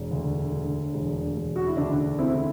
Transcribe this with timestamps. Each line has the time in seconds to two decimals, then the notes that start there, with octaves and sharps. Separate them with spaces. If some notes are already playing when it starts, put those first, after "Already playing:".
Already playing: E1
0.11 D2
0.52 D3
0.94 E1
1.36 E1
1.56 F#4
1.67 E4
1.77 D2 D4
2.18 D3 C4 E4